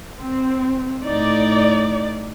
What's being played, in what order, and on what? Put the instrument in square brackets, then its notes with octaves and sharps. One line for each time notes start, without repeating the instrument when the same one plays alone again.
[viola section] C4
[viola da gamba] A2 D#4 [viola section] D5